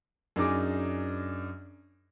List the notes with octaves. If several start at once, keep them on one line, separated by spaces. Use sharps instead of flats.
F#2 D4 D#4 G#4 D6